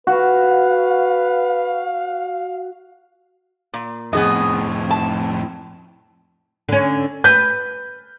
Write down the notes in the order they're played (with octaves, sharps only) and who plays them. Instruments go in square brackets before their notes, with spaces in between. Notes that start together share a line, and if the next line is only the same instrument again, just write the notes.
[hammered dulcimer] F#4 [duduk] B4 [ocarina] F5
[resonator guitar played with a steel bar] A#2
[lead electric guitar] F2 A2 [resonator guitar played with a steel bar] B3 G#4 D#5
[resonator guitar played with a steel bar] A5
[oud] D3 C#4
[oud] B4 [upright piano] G6